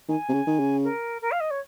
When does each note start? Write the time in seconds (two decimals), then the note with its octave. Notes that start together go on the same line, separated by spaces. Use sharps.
0.09 D#3 G#5
0.29 C3
0.34 C#3
0.47 D#3
0.60 C#3
0.84 A#4
1.22 A#4
1.32 F5
1.40 D#5
1.51 C#5